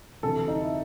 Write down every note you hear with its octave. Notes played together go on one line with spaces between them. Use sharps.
D2 C3 E3 A4
D#4
E4